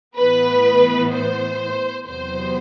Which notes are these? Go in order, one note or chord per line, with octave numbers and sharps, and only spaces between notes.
A2 E3 B3 B4
C5
E2 C3 F#3 B3 C5